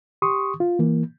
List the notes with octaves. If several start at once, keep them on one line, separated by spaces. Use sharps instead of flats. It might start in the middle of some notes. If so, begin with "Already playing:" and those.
G4 C6 C#6 D#6
F4
E3 A#3